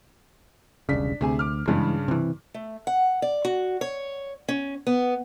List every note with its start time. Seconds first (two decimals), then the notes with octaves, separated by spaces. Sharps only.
0.89 E1 C2 C#3 D4 B6
1.21 D2 C3 G#4 G#5
1.39 D6 F6
1.68 G2 C#3 E3 G3 G#3
2.08 C3 E3
2.54 A3
2.87 F#5
3.22 D5
3.45 F#4
3.81 C#5
4.48 C#4
4.87 B3